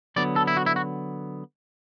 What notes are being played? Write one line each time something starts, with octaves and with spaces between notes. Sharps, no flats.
D3 F#3 B3 D5
A4
E4
F#4
E4
F#4